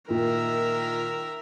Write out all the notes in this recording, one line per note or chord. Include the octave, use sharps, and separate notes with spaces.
A#2 D#3 A#4 E5